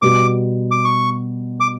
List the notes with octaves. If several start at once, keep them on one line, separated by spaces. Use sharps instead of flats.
B2 G3 B3 F#4 D6
D6
C#6
D6